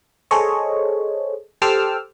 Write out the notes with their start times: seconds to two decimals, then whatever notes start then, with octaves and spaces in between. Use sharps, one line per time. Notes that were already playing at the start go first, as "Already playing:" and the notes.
0.31 G#4 A4 C5 C#5 D#5
1.62 G4 A4 C5 D6 E6 F6